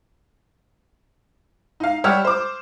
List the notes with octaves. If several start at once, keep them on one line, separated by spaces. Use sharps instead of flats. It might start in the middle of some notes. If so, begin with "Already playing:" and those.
D#4 F5
G3 G4 C#5 F#5 E6 F6
C5 D6